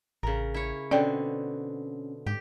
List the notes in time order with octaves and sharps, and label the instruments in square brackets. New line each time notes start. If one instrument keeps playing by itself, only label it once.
[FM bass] A1 [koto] C#3 A#4 [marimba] A#5
[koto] E4 C#5
[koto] B2 D3 C4 [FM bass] C#4 [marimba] D5 G5
[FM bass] G#2 [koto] G4